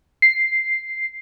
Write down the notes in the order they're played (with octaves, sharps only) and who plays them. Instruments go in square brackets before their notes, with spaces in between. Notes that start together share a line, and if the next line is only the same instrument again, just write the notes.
[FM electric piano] C7